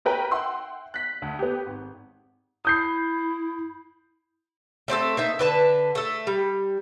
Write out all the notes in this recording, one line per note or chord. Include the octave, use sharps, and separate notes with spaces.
F#4 A#4 B4 G5
E5 F#5 G5 C6 E6
F#6 B6
D2
B3 G4
G#1
E4 D#6 G6 C7
A3 C4 E4 A4
A#3 D#4 E5
D3 B4 A5
A3 A4
G3